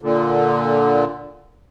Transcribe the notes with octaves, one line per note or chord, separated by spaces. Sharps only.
A#2 D3